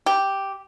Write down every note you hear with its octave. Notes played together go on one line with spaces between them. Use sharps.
G4